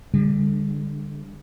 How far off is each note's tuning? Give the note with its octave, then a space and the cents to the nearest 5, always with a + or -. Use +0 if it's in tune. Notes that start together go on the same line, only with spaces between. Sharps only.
D3 +0 G3 +40